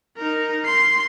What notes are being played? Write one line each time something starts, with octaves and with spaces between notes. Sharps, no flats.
D#4 A#4
C6 C7